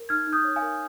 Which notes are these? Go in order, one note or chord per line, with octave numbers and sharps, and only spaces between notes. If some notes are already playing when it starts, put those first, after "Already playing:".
Already playing: A#4
D#4 F6 G#6
D#4
D#6 G6
C#5
F5 G#5
A#4